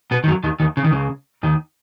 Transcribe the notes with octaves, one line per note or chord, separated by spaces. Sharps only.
B2 B3
D#3
F#2 F#3
D#2 D#3
D#2 D#3
C#3
D#3
C#2 C#3
D#2 D#3